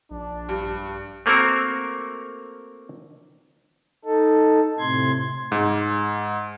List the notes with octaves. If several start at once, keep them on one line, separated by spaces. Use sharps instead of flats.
A#1 D4
G2
A3 A#3 C4 F#4 A#4
D#4 A4
A2 C3 C6 G#6
G#2